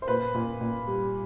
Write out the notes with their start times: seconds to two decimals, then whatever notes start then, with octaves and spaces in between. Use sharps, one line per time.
0.02 C5
0.08 A#2 B4
0.35 A#2
0.61 A#2
0.87 G3